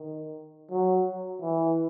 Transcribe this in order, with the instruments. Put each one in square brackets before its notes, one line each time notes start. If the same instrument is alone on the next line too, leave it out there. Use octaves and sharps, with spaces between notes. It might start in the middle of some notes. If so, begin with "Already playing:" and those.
Already playing: [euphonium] D#3
F#3
E3